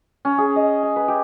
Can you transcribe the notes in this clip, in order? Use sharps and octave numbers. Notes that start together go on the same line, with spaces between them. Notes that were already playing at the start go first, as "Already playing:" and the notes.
C#4
G#4
D#5
G#5
B4
G4